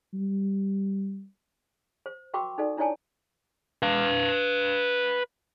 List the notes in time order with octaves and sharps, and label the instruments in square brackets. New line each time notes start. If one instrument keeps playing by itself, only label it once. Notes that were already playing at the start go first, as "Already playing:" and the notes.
[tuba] G3
[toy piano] C5
F#4 A#4 G5 B5 C#6 D6
D#4 A4 D5
D4 E4 C#5 D5 G#5 A5
[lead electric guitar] B4 F5